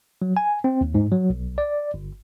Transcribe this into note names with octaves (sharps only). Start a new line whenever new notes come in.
F#3
G#5
C4
D#2
G#2
F#3
B1
D5
G1